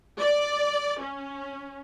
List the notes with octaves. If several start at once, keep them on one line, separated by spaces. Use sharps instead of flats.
D5
C#4